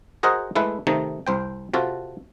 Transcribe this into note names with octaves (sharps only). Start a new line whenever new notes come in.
F#4 G#4 A#4 C5 D#5 F#5
G#3 A3 E4 B4
C3 D#3 A3 D#4
C2 C5 G5
C3 F4 F#4 A4